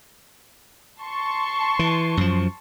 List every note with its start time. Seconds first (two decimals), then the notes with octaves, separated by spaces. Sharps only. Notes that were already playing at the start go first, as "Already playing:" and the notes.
1.02 A5 C6 C#6
1.79 E3
2.17 F#2 F3